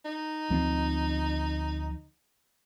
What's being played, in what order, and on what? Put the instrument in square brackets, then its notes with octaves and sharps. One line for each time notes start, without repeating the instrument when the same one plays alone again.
[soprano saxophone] D#4
[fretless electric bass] D2 F3 C4